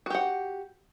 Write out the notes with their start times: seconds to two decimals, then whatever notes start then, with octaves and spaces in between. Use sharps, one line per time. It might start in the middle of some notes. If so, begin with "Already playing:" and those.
0.06 F#4
0.10 G4
0.15 F#5